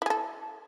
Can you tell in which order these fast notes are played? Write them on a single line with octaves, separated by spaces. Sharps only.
E4 G#4 A4